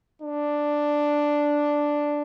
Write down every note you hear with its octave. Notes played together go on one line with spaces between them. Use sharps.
D4